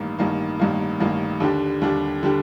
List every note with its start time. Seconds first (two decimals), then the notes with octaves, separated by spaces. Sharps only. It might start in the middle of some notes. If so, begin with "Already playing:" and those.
Already playing: A1 G2 D#3 A#3
0.19 A1 G2 D#3 A#3
0.59 A1 G2 D#3 A#3
1.00 A1 G2 D#3 A#3
1.40 D#2 D3 G3 D4 G4
1.81 D#2 D3 G3 D4 G4
2.23 D3 G3 D4 G4